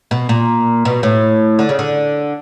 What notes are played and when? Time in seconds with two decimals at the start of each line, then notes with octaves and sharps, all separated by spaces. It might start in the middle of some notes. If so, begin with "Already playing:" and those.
0.11 B2
0.29 A#2
0.85 B2
1.03 A2
1.59 D3
1.69 C#3
1.79 D3